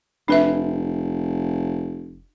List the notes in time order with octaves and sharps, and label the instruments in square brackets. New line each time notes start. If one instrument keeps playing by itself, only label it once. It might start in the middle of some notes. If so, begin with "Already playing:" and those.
[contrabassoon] F1 [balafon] D4 B4 E5